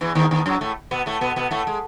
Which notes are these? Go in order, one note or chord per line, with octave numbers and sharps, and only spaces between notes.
E2 E3
D#2 D#3
D#2 D#3
F#2 F#3
A2 A3
B2 B3
A2 A3
B2 B3
B2 B3
A2 A3
G#3